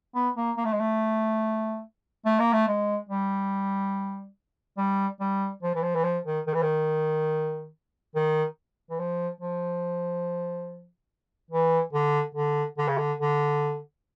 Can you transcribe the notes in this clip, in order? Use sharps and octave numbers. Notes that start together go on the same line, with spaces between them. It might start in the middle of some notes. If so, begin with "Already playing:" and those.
B3
A#3
A#3
A3
G#3
A3
A3
A#3
A3
G#3
G3
G3
G3
F3
E3
F3
E3
F3
D#3
D#3
E3
D#3
D#3
E3
F3
F3
E3
D3
D3
D3
C#3
D3
D3